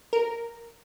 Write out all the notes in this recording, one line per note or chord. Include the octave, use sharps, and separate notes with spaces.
A#4